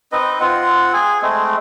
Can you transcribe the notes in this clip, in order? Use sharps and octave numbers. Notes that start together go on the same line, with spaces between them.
C4 D#4 B4 D#5
C4 F4 F#5
G#4 G#5
G#3 A3 C4